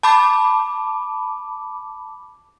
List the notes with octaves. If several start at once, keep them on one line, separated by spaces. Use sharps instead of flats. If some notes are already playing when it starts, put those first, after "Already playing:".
A5 B5 D6